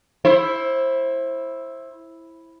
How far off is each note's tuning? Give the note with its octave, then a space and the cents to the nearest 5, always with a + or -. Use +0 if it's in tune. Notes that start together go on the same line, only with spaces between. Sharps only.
E4 +0 C5 +25